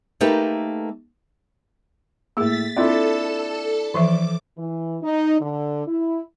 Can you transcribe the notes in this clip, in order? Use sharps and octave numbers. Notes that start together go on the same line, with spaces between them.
A3 A#3 D#4 G4 A4 B4
A2 A#3 G#4 E6 A6 B6
C4 D4 E4 F4 A4 D5 A5
E3 F3 E5 D6
E3
D#4
D3
E4